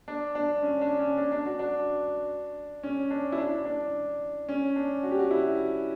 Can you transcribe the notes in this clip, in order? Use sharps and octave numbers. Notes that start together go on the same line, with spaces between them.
D4
D4
C#4
D4
C#4
D4
D4
F#4
D4
C#4
D4
E4
D4
D4
C#4
D4
F#4
G4
F#4
E4